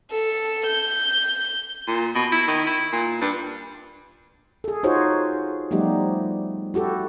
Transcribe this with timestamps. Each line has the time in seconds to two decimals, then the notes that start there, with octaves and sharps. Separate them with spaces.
0.11 A4
0.66 G6
1.88 A#2
2.15 B2
2.32 E4
2.48 D#3
2.67 E4
2.93 A#2
3.21 G2
4.64 G#4 A4
4.83 D#4 F4 F#4 G#4 C5 C#5
5.71 F3 G3 A3 B3 D#4 G4
6.74 E4 F#4 G4 A4